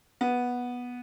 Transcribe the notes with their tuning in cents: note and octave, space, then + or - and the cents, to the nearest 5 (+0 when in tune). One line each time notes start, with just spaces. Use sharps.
B3 -10